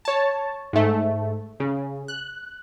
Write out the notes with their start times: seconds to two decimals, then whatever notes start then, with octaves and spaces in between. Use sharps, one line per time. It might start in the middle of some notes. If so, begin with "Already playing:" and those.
0.05 C#5 A5
0.73 G#2 A3
1.60 C#3
2.08 F#6